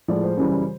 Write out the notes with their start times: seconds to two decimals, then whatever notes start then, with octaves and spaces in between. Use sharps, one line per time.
0.08 A2 F3 G#3 D5
0.23 C5
0.37 F#2 C#3 E3 G3